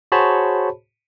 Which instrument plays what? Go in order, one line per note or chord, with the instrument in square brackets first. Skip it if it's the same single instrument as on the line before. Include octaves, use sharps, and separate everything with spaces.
[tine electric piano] F#4 G#4 C5 C#5 A5 B5